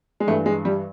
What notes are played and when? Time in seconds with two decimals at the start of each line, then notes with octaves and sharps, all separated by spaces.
0.20 G#3
0.27 G2 E3 A3
0.46 G#3
0.65 G3